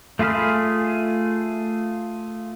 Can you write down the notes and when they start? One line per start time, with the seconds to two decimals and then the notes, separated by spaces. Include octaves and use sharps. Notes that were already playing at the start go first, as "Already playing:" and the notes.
0.19 A3 F4 G#4 B5 F6